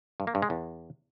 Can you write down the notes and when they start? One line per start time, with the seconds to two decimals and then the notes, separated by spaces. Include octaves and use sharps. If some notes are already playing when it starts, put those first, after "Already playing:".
0.20 G2
0.27 A#3
0.35 G2
0.42 G#3
0.50 E2